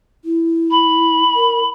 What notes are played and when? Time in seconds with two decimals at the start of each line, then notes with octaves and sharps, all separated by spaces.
0.24 E4
0.70 B5
1.35 A#4